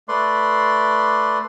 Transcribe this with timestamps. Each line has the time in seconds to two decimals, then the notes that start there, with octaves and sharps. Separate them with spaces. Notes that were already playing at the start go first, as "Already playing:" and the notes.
0.08 A3 B4 D5 C6